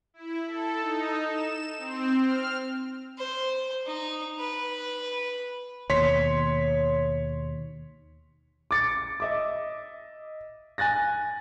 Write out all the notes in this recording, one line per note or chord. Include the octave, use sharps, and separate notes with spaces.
E4
A4
D#4
E7
C4
F6
C5
D#4
B4
D#2 B2 C#5 C6 B6
D6 A6 C#7
D#5 E5 D6
G#5 F#6 A6 A#6